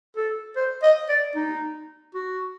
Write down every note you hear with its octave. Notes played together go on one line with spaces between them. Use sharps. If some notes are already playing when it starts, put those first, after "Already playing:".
A4
C5
D#5
D5
D#4
F#4